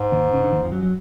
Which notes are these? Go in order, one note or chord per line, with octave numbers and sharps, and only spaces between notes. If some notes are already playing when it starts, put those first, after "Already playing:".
Already playing: G#2
D#2 D#3
C#3
D3
D#2 D#3
F2 F3
F#2 F#3
F#3